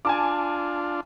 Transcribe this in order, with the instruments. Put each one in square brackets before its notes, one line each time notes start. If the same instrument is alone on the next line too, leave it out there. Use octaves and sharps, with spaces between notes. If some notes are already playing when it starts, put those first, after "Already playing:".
[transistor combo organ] D4 F4 [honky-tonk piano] G#5 A5 D6